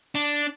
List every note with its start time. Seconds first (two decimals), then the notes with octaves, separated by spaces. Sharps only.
0.15 D4